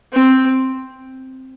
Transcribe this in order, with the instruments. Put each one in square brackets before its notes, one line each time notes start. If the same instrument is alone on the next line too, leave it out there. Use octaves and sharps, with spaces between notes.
[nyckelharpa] C4